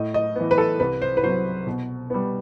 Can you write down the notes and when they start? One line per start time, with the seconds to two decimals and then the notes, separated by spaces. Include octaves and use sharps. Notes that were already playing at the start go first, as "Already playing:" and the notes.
Already playing: A2 D#5
0.14 D#5
0.36 E3 B3
0.51 B4
0.58 A4
0.80 C2 B4
1.02 C5
1.17 B4
1.23 C3 F#3 C5
1.67 B2
2.10 G3 B3